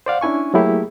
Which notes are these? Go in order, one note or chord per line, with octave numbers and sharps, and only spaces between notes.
C5 D5 F5 F#5
C#4 D4 E4 G#5 C#6
F#3 A3 A#3 E4 G4 G#4